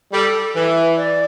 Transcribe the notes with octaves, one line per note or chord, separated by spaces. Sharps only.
G3 A4
E3
D5